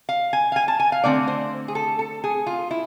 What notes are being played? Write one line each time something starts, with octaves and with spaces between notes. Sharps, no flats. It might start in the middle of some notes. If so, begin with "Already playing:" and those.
F5
G#5
F5
G#5
A5
G#5
F5
D3 A3 C4 D5
C5
G#4
A4
A4
G#4
F4
E4